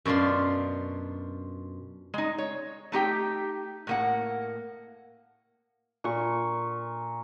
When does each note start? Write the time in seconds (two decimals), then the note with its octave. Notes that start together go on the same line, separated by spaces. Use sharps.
0.05 F#2 B2 D4 F4 C6
2.14 G#3 D#4
2.38 C#5
2.92 A3 D#4 G4 G5
3.87 A2 A#3 F#5
6.04 A#2 C#6